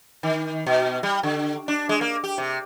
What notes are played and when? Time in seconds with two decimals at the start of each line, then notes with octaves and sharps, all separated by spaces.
0.23 D#3
0.66 B2
1.03 G3
1.23 D3
1.68 D4
1.89 G#3
2.01 A#3
2.24 G4
2.38 C3